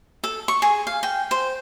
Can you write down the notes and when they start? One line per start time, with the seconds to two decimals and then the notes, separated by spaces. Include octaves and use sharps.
0.24 A4
0.48 C#6
0.62 G#4
0.87 F5
1.03 G5
1.31 C5